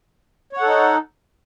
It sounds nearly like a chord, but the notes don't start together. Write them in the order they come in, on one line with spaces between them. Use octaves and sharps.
C#5 F#5 A4 D#4